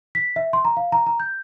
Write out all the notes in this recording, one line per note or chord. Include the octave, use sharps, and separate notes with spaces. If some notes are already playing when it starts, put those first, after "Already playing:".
B6
E5
C6
A#5
F5
A#5
A#5
G6